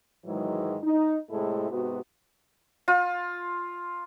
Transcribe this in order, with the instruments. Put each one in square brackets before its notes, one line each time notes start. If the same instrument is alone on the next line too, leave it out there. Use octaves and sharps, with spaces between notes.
[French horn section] G#2 D#3 E3 F#3 G#3
D#4
A2 C3 G#3 E4 A4
G#2 C3 B3 F#4
[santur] F4